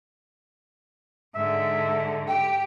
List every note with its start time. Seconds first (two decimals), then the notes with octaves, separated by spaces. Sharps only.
1.35 G#2 D3 E5
2.28 G4 G5